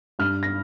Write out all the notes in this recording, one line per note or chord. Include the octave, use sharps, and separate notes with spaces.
G2 F6
A#6